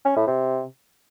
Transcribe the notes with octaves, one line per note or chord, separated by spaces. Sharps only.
C#4
A2
C3